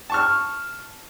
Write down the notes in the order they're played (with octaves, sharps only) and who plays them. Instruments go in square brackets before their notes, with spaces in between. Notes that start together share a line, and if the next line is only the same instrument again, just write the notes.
[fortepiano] A5 C#6 F6